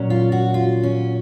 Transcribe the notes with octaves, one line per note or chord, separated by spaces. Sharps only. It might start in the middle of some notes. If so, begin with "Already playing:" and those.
Already playing: A#2 F#3 C#4
F4
F#4
F4
C#4